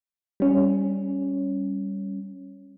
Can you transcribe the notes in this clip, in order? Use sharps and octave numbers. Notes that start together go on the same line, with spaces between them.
G3 C#4